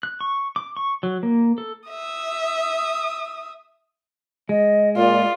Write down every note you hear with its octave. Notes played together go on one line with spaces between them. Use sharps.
F#6
C#6
D6
C#6
F#3
A#3
A4
E5 D#6
G#3 D#5
A#2 F4 D5